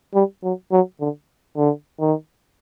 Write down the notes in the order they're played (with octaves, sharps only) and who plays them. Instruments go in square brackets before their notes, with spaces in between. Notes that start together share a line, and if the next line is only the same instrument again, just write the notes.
[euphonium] G3
F#3
F#3
D3
D3
D#3